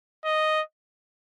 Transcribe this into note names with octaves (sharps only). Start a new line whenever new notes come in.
D#5